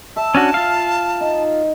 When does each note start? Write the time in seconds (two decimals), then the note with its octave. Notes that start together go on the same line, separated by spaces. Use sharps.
0.16 E5 A5
0.35 C#4 D4 F#4
0.54 F4 F5
1.21 D#4